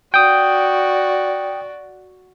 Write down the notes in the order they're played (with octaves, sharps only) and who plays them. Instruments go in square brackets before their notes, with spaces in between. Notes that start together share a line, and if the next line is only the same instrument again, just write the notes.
[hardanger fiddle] F#4 D5 [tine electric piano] G5 D#6